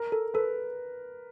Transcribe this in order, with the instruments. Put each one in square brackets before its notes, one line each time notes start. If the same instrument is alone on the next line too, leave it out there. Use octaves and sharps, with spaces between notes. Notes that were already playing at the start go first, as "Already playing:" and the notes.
Already playing: [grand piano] A#4
[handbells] A4
[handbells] A4 [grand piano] B4